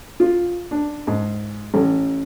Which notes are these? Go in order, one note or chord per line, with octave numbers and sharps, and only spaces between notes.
F4
D4
G#2
A1